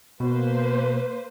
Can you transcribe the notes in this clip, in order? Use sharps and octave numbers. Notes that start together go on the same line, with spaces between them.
B2 A#3 B4 C5